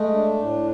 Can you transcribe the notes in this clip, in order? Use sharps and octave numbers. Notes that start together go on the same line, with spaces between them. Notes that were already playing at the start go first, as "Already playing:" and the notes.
Already playing: G#3 A3
D4
A2